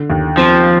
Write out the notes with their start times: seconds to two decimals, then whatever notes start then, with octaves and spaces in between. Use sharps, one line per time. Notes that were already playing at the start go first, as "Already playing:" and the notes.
Already playing: D3
0.10 D#2
0.37 F3 C4